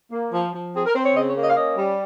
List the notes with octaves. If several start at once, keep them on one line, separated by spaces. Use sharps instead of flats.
A#3
F3
F3
C4 G#4
A#4
C4 C5
C#5
C#3 D#5
C#5
A#3
D#5
F5
C#4 D#5
G3